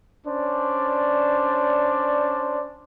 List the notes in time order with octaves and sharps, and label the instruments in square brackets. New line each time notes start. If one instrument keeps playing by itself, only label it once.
[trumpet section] C#4 D4 C5 D5